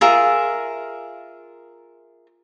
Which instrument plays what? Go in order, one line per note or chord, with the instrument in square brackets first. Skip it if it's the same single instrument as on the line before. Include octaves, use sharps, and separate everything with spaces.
[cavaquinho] F4 G#4 A#4 E5